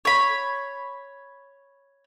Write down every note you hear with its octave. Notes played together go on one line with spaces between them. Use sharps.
C#5 B5